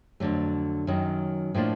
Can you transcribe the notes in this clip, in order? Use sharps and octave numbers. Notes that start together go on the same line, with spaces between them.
F2 D3 F#3 A3
F#2 D#3 F#3
A2 F3 A#3 D4 F4